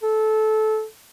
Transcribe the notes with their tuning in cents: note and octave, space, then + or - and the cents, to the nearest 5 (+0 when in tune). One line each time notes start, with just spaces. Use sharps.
A4 -20